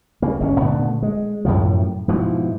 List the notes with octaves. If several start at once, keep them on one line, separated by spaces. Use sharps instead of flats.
C#3 A#3
G1 B2 C#4
A#2 D3 A3 B3
G#3
F#2 A2 C3 F3
G#2 B2 E3 F3